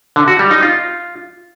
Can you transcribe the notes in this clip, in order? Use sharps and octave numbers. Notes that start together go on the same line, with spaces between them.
D3
F#4
G3
D#4
F4